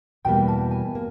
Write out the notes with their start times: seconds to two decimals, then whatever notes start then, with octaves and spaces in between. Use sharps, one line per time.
0.25 E2 B2 G3 A#3 G5
0.48 A5
0.71 G#5
0.95 A#3